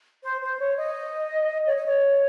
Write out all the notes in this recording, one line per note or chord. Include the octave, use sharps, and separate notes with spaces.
C5
C5
C#5
D#5
C#5
D#5
C#5